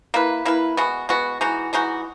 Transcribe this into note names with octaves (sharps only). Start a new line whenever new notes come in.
A#3 E4 B4
A#3 E4 B4
G#3 B3 F#4
G#3 B3 F#4
E3 G#3 D#4 F#4
E3 G#3 D#4 F#4